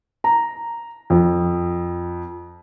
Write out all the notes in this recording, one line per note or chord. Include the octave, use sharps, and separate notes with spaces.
A#5
F2